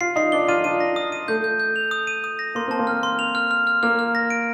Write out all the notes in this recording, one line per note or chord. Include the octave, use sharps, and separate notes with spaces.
F4 C7
D#4 C7
D4 G7
F4 D#7
D4 D#7
A#6
D#6
D#7
A3 G6
G6
G6
F7
D#6
D#7
D#6
A#6
A#3 C6
C4 A5
A#3
F6
C6
F7
F6
F6
F6
A#3 F6
F6
A#6
D7